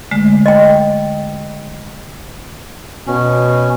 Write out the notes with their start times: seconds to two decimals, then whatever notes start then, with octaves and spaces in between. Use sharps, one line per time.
0.11 D3 G#3 A3
0.46 D#5 G5
3.07 B2 C#4